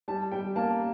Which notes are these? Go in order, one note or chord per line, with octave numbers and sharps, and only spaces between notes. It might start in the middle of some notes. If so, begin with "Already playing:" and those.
G3 A5
G3 G5
A#3 A5